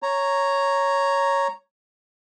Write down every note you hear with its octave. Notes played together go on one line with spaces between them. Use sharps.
C#5 A#5